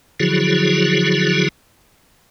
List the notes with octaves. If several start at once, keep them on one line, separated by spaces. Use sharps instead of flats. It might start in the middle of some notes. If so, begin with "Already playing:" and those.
D3 F3 F#3 E4 F#4 G#4